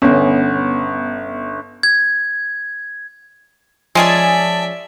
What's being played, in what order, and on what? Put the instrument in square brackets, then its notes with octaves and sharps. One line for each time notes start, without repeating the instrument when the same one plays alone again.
[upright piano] G1 [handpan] B3 C#4
[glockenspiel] G#6
[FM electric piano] F3 [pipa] G#3 C#4 G#4 [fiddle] D5 E5 [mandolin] G#5 A5